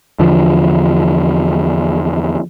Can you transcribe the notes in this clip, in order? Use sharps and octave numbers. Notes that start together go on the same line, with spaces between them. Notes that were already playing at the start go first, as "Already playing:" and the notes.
E2 D3 F3